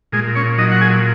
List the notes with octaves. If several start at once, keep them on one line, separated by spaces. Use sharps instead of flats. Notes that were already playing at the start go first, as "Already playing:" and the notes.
A#2 G#3 G#4
C#4 C#5
F#3 D#4 D#5
F#5
G#4 G#5